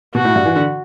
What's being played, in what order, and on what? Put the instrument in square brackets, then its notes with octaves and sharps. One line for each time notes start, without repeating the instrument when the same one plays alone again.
[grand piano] B2 [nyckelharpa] F#4
[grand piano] A2
G2
E3
D3